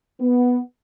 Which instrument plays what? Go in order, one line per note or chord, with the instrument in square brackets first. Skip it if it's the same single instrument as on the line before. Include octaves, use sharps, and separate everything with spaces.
[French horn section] B3